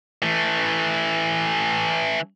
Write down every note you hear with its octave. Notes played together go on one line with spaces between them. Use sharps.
E3 A3